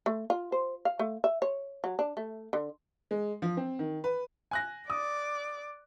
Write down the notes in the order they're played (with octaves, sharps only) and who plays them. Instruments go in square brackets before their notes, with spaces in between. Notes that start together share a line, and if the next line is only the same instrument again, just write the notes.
[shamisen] A3
F4
C5
F5
A3
E5
C#5
F#3
D4
A3
D3
[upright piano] G#3
F3
C4
D#3
B4
G#5 F#6 A#6
[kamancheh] D5 D6 [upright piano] D#6